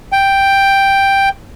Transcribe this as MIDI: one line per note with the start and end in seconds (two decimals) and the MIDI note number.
0.12 1.29 79